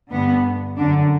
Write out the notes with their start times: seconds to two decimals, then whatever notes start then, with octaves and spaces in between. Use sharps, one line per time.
0.10 G2 D3 B3
0.77 F#2 D3 D4